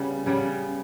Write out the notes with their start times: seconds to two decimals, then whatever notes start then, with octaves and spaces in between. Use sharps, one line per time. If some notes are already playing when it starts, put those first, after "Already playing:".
Already playing: C#3 G3 B3
0.26 C#3 G3 B3